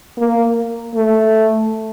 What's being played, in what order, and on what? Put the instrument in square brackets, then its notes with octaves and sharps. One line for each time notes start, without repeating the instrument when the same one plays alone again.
[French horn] A#3
A3